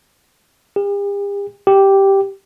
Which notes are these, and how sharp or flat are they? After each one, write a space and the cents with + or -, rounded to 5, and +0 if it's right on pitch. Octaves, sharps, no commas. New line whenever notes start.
G4 +45
G4 -5